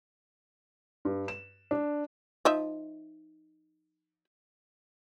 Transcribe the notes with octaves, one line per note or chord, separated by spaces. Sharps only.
G2
E7
D4
F3 D#4 E5